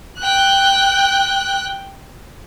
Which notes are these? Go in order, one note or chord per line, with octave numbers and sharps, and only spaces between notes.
G5 F#6